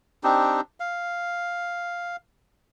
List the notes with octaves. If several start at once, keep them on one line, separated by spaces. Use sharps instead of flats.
C4 D4 D#4 G4
F5